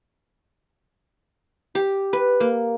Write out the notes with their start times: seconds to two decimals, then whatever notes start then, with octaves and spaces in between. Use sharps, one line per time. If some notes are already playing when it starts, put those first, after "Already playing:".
1.75 G4
2.13 B4
2.40 A#3